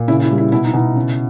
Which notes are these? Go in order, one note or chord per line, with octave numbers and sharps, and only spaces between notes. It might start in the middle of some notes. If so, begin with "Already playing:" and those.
Already playing: A#2
C#3 E4
E4
G3
E4
B2 E4
D#4
B2 E4
C#3